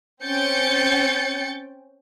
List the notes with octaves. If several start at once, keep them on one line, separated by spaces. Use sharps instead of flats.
C4 C#4 G5 G6 A6 C#7